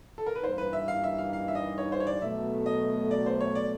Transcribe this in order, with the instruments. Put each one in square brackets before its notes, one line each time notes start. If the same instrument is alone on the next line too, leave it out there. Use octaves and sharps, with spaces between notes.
[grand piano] A4
A#4
B4
[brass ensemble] G2 E3 G3 A#3 D#4 [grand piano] C5
[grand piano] B4
E5
F5
E5
F5
F5
E5
D#5
C#5
C5
C#5
D5
[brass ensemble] B2 F#3 A3 [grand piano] E5
[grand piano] D#5
D5
C5
C#5
D5